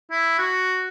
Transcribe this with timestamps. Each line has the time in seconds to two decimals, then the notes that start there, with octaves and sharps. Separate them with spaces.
0.11 E4
0.38 F#4